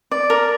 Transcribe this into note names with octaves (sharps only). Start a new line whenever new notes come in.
D5
A#4